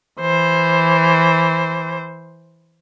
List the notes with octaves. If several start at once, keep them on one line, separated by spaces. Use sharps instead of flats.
E3 C5